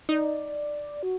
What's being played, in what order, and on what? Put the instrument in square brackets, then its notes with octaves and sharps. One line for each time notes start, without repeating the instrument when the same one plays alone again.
[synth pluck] D#4 [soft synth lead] D5
[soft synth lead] F#4